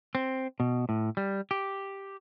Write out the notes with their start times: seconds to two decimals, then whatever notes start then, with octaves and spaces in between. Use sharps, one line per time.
0.15 C4
0.60 B2
0.89 A2
1.17 G3
1.51 G4